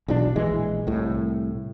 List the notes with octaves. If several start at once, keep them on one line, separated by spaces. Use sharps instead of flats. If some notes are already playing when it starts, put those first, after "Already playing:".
B1 E2 B2 D4
A#1 E3 G#3
C2 A2